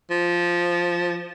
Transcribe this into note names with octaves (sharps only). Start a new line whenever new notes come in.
F3